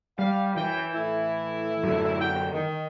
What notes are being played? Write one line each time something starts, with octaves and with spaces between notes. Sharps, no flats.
G3 F5
F#2 E3 G5
A2 E4
F#2 D3
F#5 G5
D#3